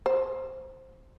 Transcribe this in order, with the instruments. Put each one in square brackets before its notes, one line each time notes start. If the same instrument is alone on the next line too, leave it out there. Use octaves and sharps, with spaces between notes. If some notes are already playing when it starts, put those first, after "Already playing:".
[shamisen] C5